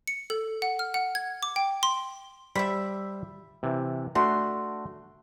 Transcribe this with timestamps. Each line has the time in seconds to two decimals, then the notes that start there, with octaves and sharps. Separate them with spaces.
0.08 C#7
0.30 A4
0.62 F#5
0.79 F6
0.94 F#5
1.15 G#6
1.43 D6
1.56 G5
1.83 C6
2.56 G3 C5 D5 E5 B5
3.63 C3 E3
4.15 A3 D4 F#4 C6